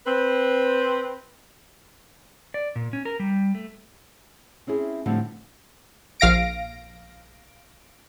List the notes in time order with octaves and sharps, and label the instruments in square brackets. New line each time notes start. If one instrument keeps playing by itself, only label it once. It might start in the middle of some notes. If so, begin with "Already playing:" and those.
[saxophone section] C4 B4
[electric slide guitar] D5
A#2
C#4
A#4
G3
A3
[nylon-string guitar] C4 C#4 E4 G#4
A2 D3 F3 G3 C4
[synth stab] A#1 F5 A#6 D7